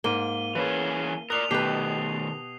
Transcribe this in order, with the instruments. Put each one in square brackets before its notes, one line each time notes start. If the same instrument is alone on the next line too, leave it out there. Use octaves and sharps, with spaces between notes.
[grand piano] G#2 [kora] A#3 [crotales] D#7 G7
[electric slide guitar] E3 C#4 G#4 [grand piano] B4
[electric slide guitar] A#4 D5 [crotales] D#6 F7 [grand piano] F#6 C7
[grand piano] B2 [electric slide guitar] D#3 A3 [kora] G4 B4 [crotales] C7